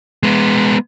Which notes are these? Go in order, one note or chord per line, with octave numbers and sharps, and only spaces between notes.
G#3 B3